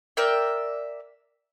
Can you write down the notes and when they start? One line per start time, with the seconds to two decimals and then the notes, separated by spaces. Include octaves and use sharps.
0.17 A#4 D5 E5 G5